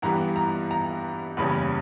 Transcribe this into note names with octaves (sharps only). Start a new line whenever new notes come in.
G2 E3 G3 B3 A#5
A#5
A#5
F#1 E2 C#3 G3 C#4 B5